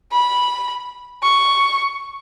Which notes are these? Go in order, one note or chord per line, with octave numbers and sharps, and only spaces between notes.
B5
C#6